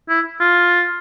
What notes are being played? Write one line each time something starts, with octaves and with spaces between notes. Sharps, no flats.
E4
F4